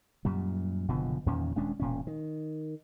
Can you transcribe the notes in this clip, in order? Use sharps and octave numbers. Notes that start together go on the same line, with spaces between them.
F#2 A#2 G3
F#1 B2 D3 F3
E2 A#2 D#3 C#4
D#1 G#3 C#4 D4
E1 A#2 C#4
D#3